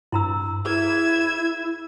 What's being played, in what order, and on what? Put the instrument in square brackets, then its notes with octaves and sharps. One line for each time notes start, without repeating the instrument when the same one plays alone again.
[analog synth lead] G2 [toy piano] E4 A#5 E6
[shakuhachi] E4 [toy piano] G#4 B4 [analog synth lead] E6 [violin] G#6 E7